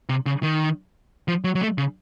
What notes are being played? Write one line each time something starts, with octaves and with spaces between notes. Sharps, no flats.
C3
C#3
D#3
F3
F#3
F#3
A3
C#3